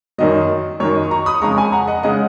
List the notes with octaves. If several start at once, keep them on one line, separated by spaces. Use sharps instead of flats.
F#2 D#3 F#3 D#5
F#2 D#3 F#3 C#5
D#5
A#5 C#6
B5 D#6
F2 C#3 G#3 A#5 C#6
G#5 B5
F#5 A#5
D#5 F#5
C#3 G#3 D#5 F#5